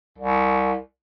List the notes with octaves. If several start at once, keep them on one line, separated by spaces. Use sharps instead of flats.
C2